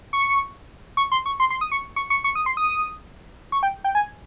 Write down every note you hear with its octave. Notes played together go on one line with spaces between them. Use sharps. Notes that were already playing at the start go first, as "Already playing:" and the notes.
C#6
C#6
C6
C#6
C6
C6
D#6
C#6
C#6
C#6
C#6
D#6
C6
D#6
C#6
G5
G5
G#5